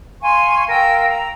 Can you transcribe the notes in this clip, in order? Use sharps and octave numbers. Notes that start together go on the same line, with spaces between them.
F5 G#5 C6 C#6
A#4 F5 G5 E6
A#5